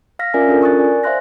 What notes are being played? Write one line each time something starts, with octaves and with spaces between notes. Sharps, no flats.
F5 F6 A#6 B6
C#4 F4 A#4 D5 E5 G#5
C#4 D4 F4 A4 A#4
A#4 C#6 D#6 F#6 A6
D5 G#5
C5 E5 F5 C6 F#6 A#6